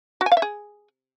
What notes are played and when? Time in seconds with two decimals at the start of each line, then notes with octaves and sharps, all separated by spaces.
0.21 F#4
0.26 G#5
0.32 F5
0.37 E5
0.42 G#4